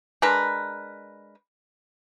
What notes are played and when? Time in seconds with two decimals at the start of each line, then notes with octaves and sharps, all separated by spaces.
0.22 G#3 D4 A#4 B4